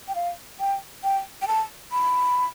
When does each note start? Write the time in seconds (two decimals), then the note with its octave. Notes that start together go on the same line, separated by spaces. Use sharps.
0.08 G5
0.15 F5
0.60 G5
1.04 G5
1.42 G5
1.48 A5
1.92 B5